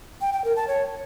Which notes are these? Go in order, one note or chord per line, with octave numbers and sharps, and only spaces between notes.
G5
G5
A#4
A5
C#5